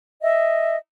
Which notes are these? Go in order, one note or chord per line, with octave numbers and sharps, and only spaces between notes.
D#5 E5